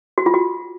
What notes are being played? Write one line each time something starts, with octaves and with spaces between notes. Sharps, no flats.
F#4
F4
F#4